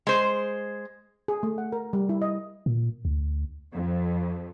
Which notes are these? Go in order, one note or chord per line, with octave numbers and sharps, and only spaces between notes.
G#3 C5
G#4
A3
F#5
A#4
G3
E4
D#5
A#2
D2
F2